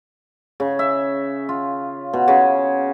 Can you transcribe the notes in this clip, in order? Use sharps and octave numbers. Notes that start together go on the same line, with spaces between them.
C#3
E5
F4
B2
C#3